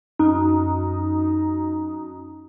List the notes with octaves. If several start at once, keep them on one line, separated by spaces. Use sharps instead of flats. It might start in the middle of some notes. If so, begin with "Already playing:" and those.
F#2 D#4